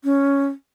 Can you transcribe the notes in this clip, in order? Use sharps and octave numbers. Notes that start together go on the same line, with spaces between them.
C#4